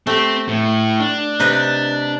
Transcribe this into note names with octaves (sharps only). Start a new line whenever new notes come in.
A3 C4 G4
A2
D4
C3 D#4 B4